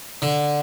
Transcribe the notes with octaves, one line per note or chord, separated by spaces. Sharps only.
D3